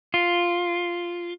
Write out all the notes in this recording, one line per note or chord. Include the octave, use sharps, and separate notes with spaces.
F4